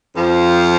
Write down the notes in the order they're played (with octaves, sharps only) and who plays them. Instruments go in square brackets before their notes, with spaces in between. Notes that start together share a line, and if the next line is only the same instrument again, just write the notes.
[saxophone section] F2 F3